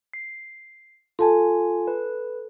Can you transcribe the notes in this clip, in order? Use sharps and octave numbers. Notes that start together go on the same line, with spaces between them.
C7
F4 A4 G#5 A5
B4